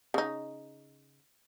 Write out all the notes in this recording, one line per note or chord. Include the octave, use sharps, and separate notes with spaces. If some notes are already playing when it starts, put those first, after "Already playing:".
C#3 D#4